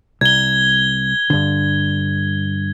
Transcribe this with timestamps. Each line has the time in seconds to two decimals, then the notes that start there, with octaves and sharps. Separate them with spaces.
0.21 C2 G#6 G7
1.30 G2 D3